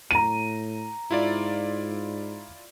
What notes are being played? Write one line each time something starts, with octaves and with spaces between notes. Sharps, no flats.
A2 A#5 D#7
G#2 E4 F4 D5